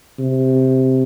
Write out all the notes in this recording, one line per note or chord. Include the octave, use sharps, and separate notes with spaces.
C3